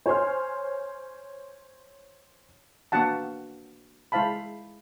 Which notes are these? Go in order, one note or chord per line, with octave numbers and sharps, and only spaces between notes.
C5 C#5 G#5 C6 F6
A#3 B3 D4 F#4 F#5 A5
G#3 E4 C5 F5 A5 B5